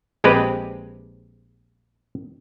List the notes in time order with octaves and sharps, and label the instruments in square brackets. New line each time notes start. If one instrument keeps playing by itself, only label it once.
[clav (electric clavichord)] A#1 G#3 C4 G4 B4